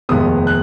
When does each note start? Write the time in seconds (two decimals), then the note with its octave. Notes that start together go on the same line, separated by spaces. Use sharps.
0.09 F1 D#2 D#3 G#3 B3 D#6
0.47 F#6